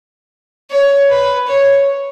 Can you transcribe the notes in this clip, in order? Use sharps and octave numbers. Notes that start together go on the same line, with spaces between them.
C#5
B4
C#5